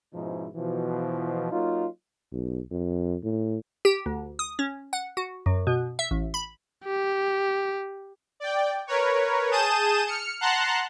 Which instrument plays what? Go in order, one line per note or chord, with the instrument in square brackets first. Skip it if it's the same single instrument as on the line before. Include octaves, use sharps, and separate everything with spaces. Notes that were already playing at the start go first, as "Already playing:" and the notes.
[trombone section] G#2 B2 F3 C#4 D#4 E4
B2 E3 F3
F#3 A#3 D#4 F4
[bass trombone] B1
F2
A2
[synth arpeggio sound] G4
D2
D#6
C#4
F#5
F#4
F#2
B2
E5
A1
B5
[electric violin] G4
[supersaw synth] D5 G5
A#4 B4 C#5
G#4 A5 D#6 G6 D#7 E7
F6 C#7
F#5 A5 A#5 C6 F#6